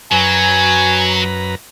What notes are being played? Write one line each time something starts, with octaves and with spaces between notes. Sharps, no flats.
F#2 F#3 B4 G#5 A#5